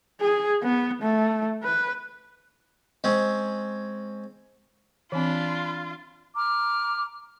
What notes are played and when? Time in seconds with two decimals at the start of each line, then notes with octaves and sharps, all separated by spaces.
0.21 G#4
0.63 B3
1.02 A3
1.63 B4
3.04 G#3 C4 C#4
5.12 E3 C4 D4 F4 B5
6.35 A#5 D6 F6